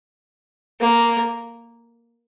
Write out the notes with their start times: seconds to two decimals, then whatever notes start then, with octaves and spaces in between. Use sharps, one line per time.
0.80 A#3